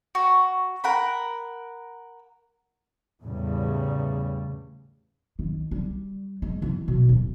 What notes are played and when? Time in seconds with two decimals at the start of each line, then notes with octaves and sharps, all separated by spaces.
0.15 F#4
0.84 A#4 F#5 B5
3.22 E2 A2 C#3 G3
5.39 D#3
5.71 G3
6.42 G#3
6.62 E3
6.88 B2
7.09 D1